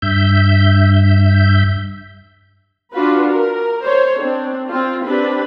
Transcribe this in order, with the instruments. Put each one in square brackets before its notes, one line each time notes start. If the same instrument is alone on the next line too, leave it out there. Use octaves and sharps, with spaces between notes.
[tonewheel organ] G2 E5 G6
[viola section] D4 F4 F#4 B4
A#4
C5 C#5
C4 D4
C4 F4
C4 D4 G4 B4